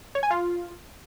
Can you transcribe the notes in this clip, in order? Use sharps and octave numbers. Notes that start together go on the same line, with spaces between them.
C#5
G#5
F4